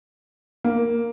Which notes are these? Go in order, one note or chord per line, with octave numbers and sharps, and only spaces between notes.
A#3